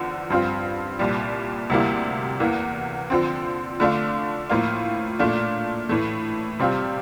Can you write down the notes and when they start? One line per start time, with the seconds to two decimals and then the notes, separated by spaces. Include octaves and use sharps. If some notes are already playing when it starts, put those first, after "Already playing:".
Already playing: E2 D3 F3
0.30 G2 F3 C4 F4
0.99 C2 A#2 G3
1.70 D2 C3 G3 A#3 E4
2.40 E2 E3 A#3
3.10 D3 F3 C4
3.80 D3 A3 D4 F4
4.50 A2 F3 A#3 F4
5.19 A#2 A3 D4 F4
5.89 A2 E3 A3
6.59 C3 G3 C4 F4